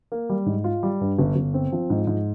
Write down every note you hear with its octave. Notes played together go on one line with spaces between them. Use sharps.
A#3
G3
G#2
F4
G3
G2
G1
G1
C4
F3
G#2
G#2